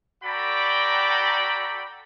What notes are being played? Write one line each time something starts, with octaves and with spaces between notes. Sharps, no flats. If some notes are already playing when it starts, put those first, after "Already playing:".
F#4 A4 D5 G5 A#5 B5